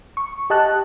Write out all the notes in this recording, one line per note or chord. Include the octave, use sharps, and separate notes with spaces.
C#6
G4 D#5 A5 F#6